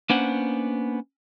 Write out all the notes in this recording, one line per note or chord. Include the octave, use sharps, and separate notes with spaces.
A#3 B3 C#4 D4 C5 F#5